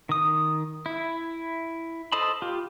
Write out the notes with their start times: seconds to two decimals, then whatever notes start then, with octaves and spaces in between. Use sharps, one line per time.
0.09 D#3 D#6
0.86 E4
2.12 A4 C5 D#5 A5 B5
2.42 F4 G4